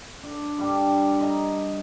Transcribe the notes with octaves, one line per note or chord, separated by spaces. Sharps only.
D4
G2 G3 D4
D#5 A5 A#5